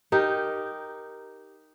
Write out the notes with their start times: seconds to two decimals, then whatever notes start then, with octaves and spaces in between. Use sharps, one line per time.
0.12 D#4 G4 A#4